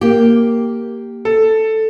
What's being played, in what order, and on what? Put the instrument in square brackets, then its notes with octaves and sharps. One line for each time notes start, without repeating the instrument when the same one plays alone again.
[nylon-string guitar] A#3 G4
[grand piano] A4